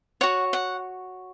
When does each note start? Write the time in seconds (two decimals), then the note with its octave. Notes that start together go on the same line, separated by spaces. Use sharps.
0.21 F#4 C#5 F#5
0.53 F#5